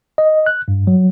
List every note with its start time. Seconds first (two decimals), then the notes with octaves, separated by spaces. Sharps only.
0.18 D#5
0.46 F#6
0.68 G2
0.87 F#3